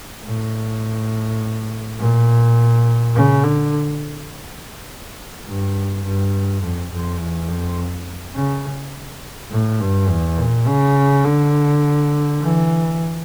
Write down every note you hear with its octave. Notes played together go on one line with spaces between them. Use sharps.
A2
A#2
C#3
D3
G2
G2
F2
F2
E2
F2
C#3
A2
G2
E2
A#2
C#3
D3
E3